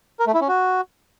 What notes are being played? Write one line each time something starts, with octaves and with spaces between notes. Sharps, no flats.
A#4
A3
E4
C#4
F#4